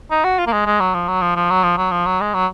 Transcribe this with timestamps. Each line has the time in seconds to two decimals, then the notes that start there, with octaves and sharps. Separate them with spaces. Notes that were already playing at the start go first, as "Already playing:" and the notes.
0.11 D#4
0.24 F#4
0.39 F4
0.46 A#3
0.53 G#3
0.66 G#3
0.80 F#3
0.94 F3
1.08 F#3
1.21 F3
1.36 F3
1.50 F#3
1.63 F3
1.77 F#3
1.91 F3
2.06 F#3
2.20 G#3
2.34 F#3